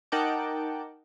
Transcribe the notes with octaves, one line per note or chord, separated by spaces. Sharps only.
D#4 A#4 F#5 G5 A5 D6